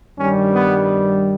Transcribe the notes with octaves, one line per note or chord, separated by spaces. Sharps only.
G2 D#3 G3 C#4
B3